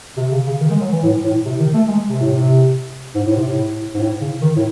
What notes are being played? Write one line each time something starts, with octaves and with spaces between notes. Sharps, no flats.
C3
C#3
C#3
D#3
G#3
F#3
E3
A2
A2
C3
D#3
A3
G#3
C3
A2
C3
G#2
A2
C3
A2
G#2
A2
C#3
D#3
A2